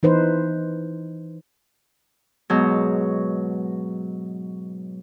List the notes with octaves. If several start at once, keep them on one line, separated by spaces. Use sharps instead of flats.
E3 D#4 B4 C5
G#2 B2 F#3